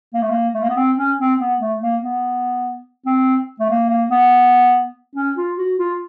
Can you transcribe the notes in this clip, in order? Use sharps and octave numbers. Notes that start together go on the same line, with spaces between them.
A#3
A3
A#3
A3
A#3
B3
C4
C#4
C4
B3
A3
A#3
B3
C4
A3
A#3
A#3
B3
C#4
F4
F#4
F4